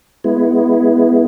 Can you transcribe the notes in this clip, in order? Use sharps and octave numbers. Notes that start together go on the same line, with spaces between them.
G#3 B3 E4